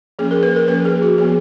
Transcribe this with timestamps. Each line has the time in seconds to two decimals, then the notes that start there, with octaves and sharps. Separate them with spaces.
0.19 F3 A#3 C#4 G#4
0.31 A#4
0.43 B4
0.56 A#4
0.68 F3 A#3 C#4 B4
0.85 G#4
1.02 F#4
1.18 F3 B3 G#4